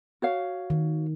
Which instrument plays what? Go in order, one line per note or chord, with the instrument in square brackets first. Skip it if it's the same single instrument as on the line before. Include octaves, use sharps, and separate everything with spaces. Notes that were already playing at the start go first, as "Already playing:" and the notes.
[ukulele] F#4 C#5 F5
[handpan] D#3